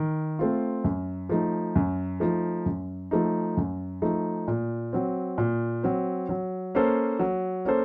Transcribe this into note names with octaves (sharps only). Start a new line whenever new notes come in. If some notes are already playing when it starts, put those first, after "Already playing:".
Already playing: D#3
A3 C4 F4
F#2
F3 A3 D#4
F#2
F3 A3 D#4
F#2
F3 A3 D#4
F#2
F3 A3 D#4
A#2
F#3 C4
A#2
F#3 C4
F#3
A#3 C#4 A4 C5
F#3
A#3 C#4 A4 C5